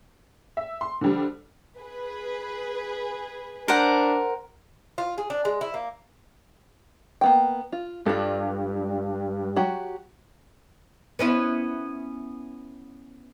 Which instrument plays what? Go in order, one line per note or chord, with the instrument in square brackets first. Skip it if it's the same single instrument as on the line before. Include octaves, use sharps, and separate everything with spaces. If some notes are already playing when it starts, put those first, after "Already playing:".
[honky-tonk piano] E5
C6
D3 F3 G3 D4
[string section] G#4 B4
[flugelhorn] D4 [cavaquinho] A#4 C5 F#5
[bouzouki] F4
G#4
D4
G#3
E4
A#3
[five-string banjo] A#3 B3 G5
F4
[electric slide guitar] G2 [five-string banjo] F4 A4
[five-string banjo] F#3 F#4 G4
[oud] B3 C#4 E4